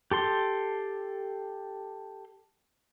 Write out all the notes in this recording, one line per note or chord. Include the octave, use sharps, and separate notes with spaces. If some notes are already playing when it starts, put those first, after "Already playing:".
G4 A4 C6